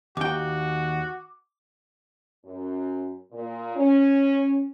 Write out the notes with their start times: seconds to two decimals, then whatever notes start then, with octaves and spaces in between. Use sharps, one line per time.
0.17 D#2 F#4 G5 D6
2.45 F#2
3.32 A#2
3.76 C#4